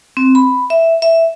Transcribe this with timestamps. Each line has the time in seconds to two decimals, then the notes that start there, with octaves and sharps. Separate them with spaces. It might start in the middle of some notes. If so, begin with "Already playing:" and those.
0.17 C4
0.35 B5
0.70 E5
1.02 E5